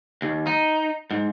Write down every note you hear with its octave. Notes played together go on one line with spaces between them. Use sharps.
D#2
D#4
G#2